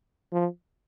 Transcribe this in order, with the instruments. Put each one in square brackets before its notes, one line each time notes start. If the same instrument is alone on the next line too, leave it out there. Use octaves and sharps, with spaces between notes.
[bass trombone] F3